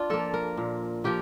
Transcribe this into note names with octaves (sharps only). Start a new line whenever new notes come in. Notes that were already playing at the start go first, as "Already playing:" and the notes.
Already playing: D4 F4
F3 A#3 A4
A#4
A#2
F3 A#3 G4